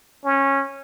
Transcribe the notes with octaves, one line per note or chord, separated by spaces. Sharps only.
C#4